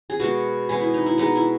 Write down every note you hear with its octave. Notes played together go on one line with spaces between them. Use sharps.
G#4
B2 G#3 B3 F#4
B2 G#3 B3 G#4
E4
D#4
E4
B2 G#3 B3 D#4
E4